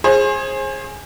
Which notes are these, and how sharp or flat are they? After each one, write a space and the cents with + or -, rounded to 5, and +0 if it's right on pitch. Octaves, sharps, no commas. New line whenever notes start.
G#4 +0 C5 +35